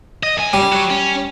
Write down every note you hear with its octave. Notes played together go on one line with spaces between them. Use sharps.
D#5
F#2 G#5
G3
F#3 F#4
C#4